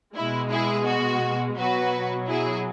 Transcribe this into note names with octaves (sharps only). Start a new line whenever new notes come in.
B2 G#3 E4
E4 G#4
F#4
B2 F#3 F#4 B4
E4 G#4